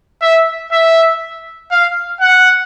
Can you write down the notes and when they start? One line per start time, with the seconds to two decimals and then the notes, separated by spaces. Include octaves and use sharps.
0.22 E5
0.72 E5
1.71 F5
2.21 F#5